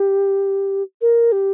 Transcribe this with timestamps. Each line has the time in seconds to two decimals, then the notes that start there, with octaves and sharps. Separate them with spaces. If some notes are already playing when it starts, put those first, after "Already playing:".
Already playing: G4
1.01 A#4
1.32 G4